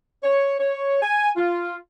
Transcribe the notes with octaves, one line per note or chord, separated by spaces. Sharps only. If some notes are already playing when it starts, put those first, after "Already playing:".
C#5
C#5
G#5
F4